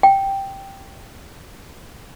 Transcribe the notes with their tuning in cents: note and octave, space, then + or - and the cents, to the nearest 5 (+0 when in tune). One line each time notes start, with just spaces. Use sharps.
G5 -5